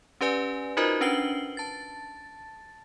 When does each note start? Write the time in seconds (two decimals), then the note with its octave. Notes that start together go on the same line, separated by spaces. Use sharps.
0.21 C#4 G4 B4 D5 G#5
0.77 D#4 F4 F#4 A#4 C5 D#5
1.01 C#4 D4 B4 C7 F#7 G7
1.57 A5 A6